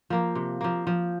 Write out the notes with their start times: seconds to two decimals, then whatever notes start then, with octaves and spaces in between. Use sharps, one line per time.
0.10 F3 A#3
0.35 C3
0.61 F3 A#3
0.87 F3